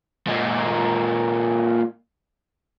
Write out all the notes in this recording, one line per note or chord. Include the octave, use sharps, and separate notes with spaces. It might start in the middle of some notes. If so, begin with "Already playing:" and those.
A#2 G#3